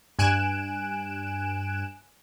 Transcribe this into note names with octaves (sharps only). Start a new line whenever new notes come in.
G2 G#5 F#6 D7 E7